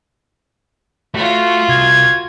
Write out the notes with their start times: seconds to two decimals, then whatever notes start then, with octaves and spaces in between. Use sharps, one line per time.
1.14 A3 F4 F#4
1.69 C2 G#6